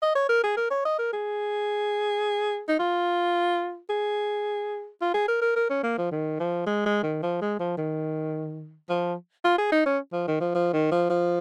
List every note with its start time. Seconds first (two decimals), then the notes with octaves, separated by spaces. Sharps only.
0.02 D#5
0.15 C#5
0.29 A#4
0.43 G#4
0.57 A#4
0.70 C#5
0.85 D#5
0.99 A#4
1.13 G#4
2.69 D#4
2.79 F4
3.90 G#4
5.01 F4
5.14 G#4
5.28 A#4
5.42 A#4
5.56 A#4
5.70 C#4
5.83 A#3
5.98 F3
6.12 D#3
6.40 F3
6.66 G#3
6.86 G#3
7.03 D#3
7.23 F3
7.41 G#3
7.60 F3
7.77 D#3
8.89 F3
9.44 F4
9.58 G#4
9.72 D#4
9.86 C#4
10.13 F3
10.28 D#3
10.40 F3
10.54 F3
10.73 D#3
10.91 F3
11.10 F3